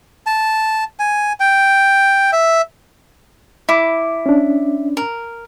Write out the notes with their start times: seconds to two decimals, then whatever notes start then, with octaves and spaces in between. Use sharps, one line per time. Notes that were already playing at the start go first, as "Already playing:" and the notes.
0.26 A5
0.99 G#5
1.40 G5
2.33 E5
3.69 E4 D6
4.26 C#4 D4
4.97 A#4